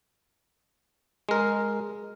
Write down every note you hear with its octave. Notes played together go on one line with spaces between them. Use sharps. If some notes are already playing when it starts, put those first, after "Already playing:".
G#3 A#4